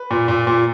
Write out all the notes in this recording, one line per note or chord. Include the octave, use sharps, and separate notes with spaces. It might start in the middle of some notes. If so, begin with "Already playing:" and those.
Already playing: B4
A#2
A#2
A#2